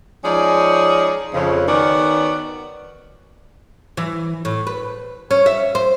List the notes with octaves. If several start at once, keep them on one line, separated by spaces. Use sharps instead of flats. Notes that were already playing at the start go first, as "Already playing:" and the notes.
F3 G#3 C#4 D#4 G#4 D5
F2 C#3
D#3 B3 C#4 F#4 D5
E3
A2
B4
C#4
E5
C5